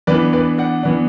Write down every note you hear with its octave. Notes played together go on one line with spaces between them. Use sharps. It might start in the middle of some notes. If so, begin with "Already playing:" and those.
E3 B3 D4 B4 D5
B4 D5
D5 F#5
E3 B3 D4